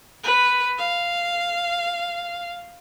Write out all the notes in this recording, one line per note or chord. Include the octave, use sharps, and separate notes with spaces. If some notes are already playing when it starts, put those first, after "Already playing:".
B4
F5